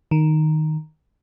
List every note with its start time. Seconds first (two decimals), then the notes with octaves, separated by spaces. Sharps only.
0.11 D#3